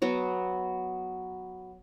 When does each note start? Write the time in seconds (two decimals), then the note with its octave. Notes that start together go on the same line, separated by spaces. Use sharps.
0.02 F#3 B3 F#4